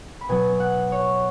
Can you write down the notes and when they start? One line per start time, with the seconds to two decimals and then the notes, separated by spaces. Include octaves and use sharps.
0.21 B5
0.29 B2 F#3 B3 G#5
0.60 F#5
0.92 C#5